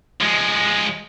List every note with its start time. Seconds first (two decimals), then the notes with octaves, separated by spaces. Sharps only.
0.21 F3 G#3